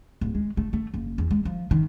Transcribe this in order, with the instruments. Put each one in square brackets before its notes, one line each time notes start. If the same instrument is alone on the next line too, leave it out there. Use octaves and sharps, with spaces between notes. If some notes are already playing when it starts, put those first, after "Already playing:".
[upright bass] D1
G#3
A3
A3
F#1
E2
G#3
F3
D#3